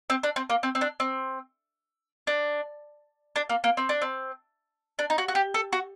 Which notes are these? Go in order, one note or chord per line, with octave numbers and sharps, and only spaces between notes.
C4
D4
C4
A#3
C4
C4
D4
C4
D4
D4
A#3
A#3
C4
D4
C4
D4
D#4
F#4
F#4
G4
A4
F#4